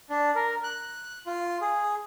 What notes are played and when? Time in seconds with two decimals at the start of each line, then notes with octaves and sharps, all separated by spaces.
0.10 D4
0.35 A#4
0.64 F#6
1.26 F4
1.61 G#4